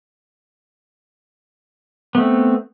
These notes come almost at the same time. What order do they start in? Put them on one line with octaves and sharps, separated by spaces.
B3 A3 C4